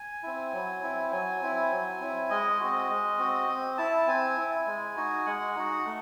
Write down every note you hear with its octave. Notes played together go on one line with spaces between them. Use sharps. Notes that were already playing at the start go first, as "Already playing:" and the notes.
Already playing: G#5
C4 E4
F#3
C4 E4
F#3 G#5
C4 E4
F#3
C4 E4
G#3 D#5
C4 F#4
G#3
C4 F#4
C4
E4 A5
C4 G#5
E4
G#3
D#4 F#4
G#3 F#5
D#4 F#4
A3